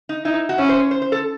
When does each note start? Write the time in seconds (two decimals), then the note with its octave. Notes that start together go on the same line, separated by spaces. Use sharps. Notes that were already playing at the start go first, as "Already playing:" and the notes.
0.09 D#4
0.25 D#4 E4
0.49 F#4
0.58 C#4 E4
0.69 C5
0.79 C#5
0.91 C5
1.02 C5
1.12 A4